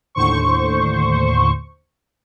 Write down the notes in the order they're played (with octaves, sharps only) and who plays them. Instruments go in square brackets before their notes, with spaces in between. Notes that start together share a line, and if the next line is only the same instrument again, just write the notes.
[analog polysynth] D#2 A2 D3 C5 C#6